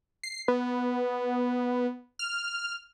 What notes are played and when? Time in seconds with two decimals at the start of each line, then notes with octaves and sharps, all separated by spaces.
0.23 C7
0.48 B3
2.19 F6